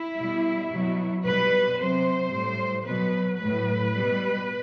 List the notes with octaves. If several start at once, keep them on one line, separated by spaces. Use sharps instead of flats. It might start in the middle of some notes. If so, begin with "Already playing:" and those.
Already playing: E4
B2 G3
B2 F#3
B2 G3 B4
C3 F#3 C5
A2 G3
B2 F#3 B4
A2 F#3 B4
B2 G3